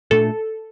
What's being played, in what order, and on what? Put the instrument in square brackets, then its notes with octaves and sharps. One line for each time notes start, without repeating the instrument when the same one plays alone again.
[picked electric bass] A#2 A3 D4 [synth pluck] A4